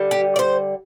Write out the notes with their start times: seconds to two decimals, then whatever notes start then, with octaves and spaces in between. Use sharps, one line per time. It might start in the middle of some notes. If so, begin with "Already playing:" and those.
Already playing: D3 G3
0.11 G4
0.36 D5
0.39 C5